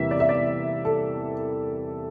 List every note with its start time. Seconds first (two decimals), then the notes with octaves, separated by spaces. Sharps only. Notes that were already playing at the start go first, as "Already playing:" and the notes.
Already playing: E2 C3 E3 G3 A#3 E5
0.11 D5
0.20 E5
0.29 D5
0.85 A4